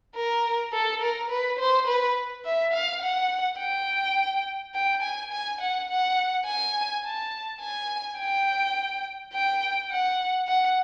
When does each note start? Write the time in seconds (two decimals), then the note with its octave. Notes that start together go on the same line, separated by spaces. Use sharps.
0.15 A#4
0.73 A4
1.01 A#4
1.30 B4
1.59 C5
1.87 B4
2.45 E5
2.73 F5
3.02 F#5
3.59 G5
4.75 G5
5.03 G#5
5.32 G#5
5.61 F#5
5.89 F#5
6.46 G#5
7.04 A5
7.61 G#5
8.19 G5
9.33 G5
9.91 F#5
10.48 F#5